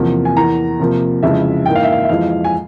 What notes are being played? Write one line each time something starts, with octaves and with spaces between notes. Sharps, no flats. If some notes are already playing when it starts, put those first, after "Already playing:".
Already playing: E2 C3 F3 A#3
G#5
E2 E3 A#3 A#5
C3 F3 A#3
F2 C#3 E3 G#3 E5
G#2 E3 A#3 G5
F5
E5
F5
E5
F2 E3 G#3 F5
G#5